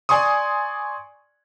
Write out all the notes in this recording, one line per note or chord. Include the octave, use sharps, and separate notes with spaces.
D5 G#5 C6 C#6 D#6